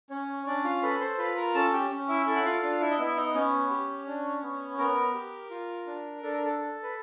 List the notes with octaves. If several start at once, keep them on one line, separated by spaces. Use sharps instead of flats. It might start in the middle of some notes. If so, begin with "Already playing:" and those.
C#4 C#5
C#4 D4 D5
F4 F5
A4 B4 B5
C5 C6
F4 B4 B5
A#4 A#5
C#4 A4 A5
G4 G5
C#4
E4 E5
E4 A4 E5
F#5
F4 F5
D4 F4 F5
E4 E5
D#5
B3 E4 E5
D#4 D#5
B3 C#4 C#5
G4
D4
B3
B3 A#4
G4
F4
D4
D4 A4
A#4
A4
A4
B4